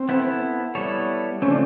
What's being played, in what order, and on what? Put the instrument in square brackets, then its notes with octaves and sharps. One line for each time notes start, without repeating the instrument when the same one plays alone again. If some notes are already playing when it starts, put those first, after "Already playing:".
Already playing: [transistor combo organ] C4
[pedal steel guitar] B3 E4 A4
G3 B3 E4 A4 C#5
[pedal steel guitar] C#3 F3 A3 C4 [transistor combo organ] C#4
[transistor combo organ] D4